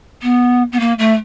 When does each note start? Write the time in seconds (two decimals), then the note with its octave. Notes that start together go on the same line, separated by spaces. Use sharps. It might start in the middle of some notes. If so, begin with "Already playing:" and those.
0.22 B3
0.72 B3
0.80 A#3
0.99 A3